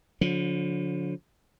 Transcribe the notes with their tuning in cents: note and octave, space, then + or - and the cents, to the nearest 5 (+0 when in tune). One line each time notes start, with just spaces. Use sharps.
D3 -35 F3 +35